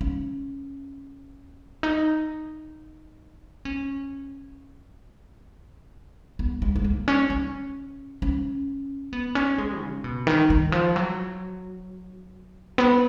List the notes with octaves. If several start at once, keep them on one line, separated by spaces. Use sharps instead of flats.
C#4
D#4
C#4
B3
G#3
G#3
A#3
C#4
C#4
C#4
B3
C#4
G#3
C#3
B2
D#3
D#3
F3
F#3
B3